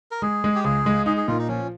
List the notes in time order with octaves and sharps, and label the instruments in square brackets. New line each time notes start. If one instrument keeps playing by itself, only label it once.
[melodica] A#4
[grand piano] G#3 [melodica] G#4
[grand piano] G#3
[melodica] G4
[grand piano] C#2 [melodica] G#4
[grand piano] G#3
[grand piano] D#4 [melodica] G#4
[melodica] G#4
[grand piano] A#2 [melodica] F4
[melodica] D#4
[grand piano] F3 [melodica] C#4